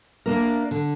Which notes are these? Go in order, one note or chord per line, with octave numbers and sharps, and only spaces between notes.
A#3 D4 A#4 E5
D3